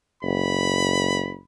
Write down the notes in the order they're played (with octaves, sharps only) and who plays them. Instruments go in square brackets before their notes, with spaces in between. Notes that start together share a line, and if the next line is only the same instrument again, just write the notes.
[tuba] F#1 [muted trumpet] B5